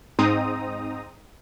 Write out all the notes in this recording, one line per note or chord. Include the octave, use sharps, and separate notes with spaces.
G#2 C4 D#4 A#5 D#6